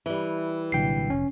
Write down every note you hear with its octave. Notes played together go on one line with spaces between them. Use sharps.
E3 G3
C2 A#2 D3 F#3 G5 C7
F1 C#4